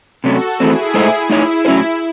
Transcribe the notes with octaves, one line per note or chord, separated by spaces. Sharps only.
C3 F#3 A3 C#4 F#4 A4
E3 A3 C4 E4 G#4
A2 G#3 D#4 A4 C5
A3 D#4 E4 G#4 C#5
A2 F#3 C#4 G#4 C5